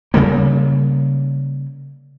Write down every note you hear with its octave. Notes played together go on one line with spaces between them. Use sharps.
C#3 G3 A#3